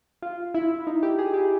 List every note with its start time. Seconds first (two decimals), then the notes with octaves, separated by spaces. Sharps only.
0.22 F4
0.54 E4
0.87 D#4
1.03 G4
1.19 G#4
1.34 G4